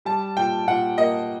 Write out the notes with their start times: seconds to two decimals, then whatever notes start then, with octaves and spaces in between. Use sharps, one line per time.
0.05 G3 A5
0.37 A#2 G5
0.67 A#2 F#5
0.98 A#3 D#5